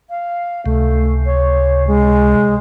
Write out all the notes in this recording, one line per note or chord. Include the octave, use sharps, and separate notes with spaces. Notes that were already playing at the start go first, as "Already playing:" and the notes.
F5
C#2 C3 A3
C#5
G#3